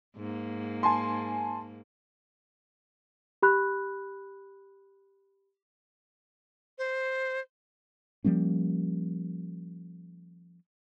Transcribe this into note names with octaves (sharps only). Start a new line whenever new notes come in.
G#2 A#3
G#5 A5 C6
G4 B5 F#6
C5
F3 G3 A#3 C#4